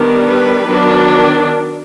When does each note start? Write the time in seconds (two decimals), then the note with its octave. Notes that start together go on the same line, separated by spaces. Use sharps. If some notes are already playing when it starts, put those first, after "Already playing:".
Already playing: D#3 G3 B3 D4
0.28 B4
0.67 D#3 F#3 B3 D4